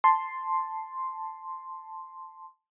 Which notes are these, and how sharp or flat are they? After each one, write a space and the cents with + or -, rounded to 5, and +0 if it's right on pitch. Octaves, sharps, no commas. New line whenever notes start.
A5 +0 C6 +0